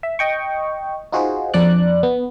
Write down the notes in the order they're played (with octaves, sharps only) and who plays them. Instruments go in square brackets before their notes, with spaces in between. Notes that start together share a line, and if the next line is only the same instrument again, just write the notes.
[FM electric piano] E5
D#5 G5 C#6
D#4 F4 F#4 G#4 C5
F2 D4 D5 F#6
B3